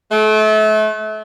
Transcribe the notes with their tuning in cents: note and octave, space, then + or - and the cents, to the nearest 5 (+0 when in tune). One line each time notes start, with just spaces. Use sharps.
A3 -35